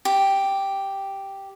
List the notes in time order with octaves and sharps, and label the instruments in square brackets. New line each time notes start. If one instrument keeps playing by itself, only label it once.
[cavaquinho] G4